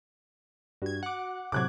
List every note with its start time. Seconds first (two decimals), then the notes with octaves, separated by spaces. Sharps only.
0.82 G2 F#4 G#6
1.03 F#5 D6
1.52 A2 C3 F#3 D6 F#6 G#6